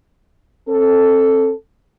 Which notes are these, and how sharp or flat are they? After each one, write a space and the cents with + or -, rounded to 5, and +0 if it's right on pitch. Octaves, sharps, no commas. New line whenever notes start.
C4 +35 A4 +5